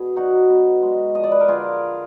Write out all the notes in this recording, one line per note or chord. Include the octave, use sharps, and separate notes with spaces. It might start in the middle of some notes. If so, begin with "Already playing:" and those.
Already playing: B2 G#4
F#3 D#4 F#4
B2
G#3
F3 D#5
D5
B4
A#4
D3 F4 G#4